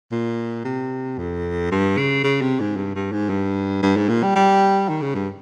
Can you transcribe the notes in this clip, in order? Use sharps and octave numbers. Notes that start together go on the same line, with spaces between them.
A#2
C3
F2
G2
C#3
C#3
C3
G#2
G2
G2
G#2
G2
G2
G#2
A#2
G3
G3
D#3
C#3
G2